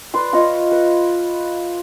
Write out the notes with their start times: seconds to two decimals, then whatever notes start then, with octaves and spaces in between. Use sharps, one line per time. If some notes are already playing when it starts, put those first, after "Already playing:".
0.14 B4 D5 C6
0.33 F4 C#5 D#5 F5
0.72 B4